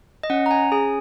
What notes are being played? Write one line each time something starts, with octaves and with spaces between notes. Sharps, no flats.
D#5
C#4 F#5
A#5
G#5
G#4 G#5